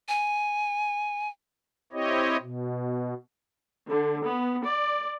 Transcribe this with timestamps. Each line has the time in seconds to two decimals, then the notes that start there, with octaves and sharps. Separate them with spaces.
0.09 G#5
1.93 C4 E4 G4 C#5 D#5
2.41 B2
3.88 D3
4.25 B3
4.65 D5